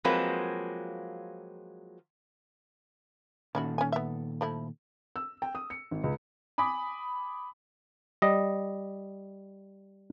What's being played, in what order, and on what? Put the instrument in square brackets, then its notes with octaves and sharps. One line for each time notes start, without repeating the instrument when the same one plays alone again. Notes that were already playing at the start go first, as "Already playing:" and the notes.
[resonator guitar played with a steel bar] F3 F#3 G#3 A#3 C4 B4
[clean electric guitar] A#2 D#3 A4 [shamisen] C#4 E4 F#4
[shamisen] C#4 G#5
B3 E5
F3 A3 E4
[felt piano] E6
G5
D#6
C#7
G#1
C#2
[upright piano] G#5 B5 D6 D#6 B6
[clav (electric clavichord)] G3 D#5